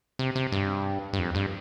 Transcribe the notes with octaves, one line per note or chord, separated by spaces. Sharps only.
C3
C3
G2
G2
F2
G2